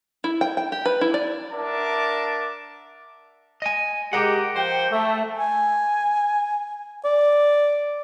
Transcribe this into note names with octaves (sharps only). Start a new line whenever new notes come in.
E4
G5
G5
G4
B4
E4
D5
D4 A#4 E5 F#5 A5 D6
D#5 G#5
G#3 G4 A#4 F#5
F3 C5 G5
A3
G#5
D5